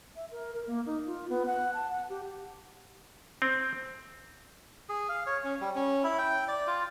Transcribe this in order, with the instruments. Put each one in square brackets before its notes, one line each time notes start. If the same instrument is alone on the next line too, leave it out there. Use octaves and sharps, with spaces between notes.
[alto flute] E5
A#4
A#4
A#3
D#4
F4
B3
F#5
A5
F#5
G4
[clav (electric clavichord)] C4
[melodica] G#4
F5
C#5
C#4
G3
C#4
E4
G5
D5
F4